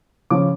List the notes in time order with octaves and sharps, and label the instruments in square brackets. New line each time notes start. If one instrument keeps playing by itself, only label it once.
[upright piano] C#3 F3 C#4 D6